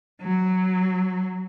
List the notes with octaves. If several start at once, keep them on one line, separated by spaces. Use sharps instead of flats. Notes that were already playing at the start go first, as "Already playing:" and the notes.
F#3